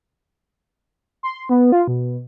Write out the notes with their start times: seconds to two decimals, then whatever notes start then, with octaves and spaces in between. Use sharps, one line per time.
1.23 C6
1.49 B3
1.72 F4
1.88 B2